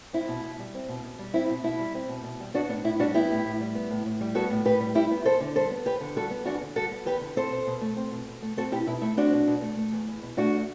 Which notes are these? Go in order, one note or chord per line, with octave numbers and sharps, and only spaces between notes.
C4 E4
B2
B2
G3
C4
B2
B2
G3
C4 E4
B2
B2 E4
G3
C4
B2
B2
G3
B3 D4 F#4
A2 D4
A2 E4
G3 D4 F#4
B3 E4 G4
A2
A2
G3
B3
A2
A2
G3
B3 F#4 A4
A2
A2 G4 B4
G3
G3 E4 G4
B3
E2 A4 C5
D3
G3 A4 C5
B3
E2 G4 B4
D3
G3 F#4 A4
B3
E2 D4 F#4
D3
G3 F#4 A4
B3
E2 G4 B4
D3
C4 A4 C5
B2
B2
A3
C4
B2
B2
A3
C4 F#4 A4
B2 E4 G4
B2 E4
A3 E4
C4 D4 F#4
B2
B2
A3
A3
E2
E2
B2
A3 D4 F#4